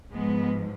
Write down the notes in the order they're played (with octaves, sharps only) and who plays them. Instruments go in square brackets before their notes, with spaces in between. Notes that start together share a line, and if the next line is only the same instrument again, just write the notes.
[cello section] G#2 F3 G#3 B3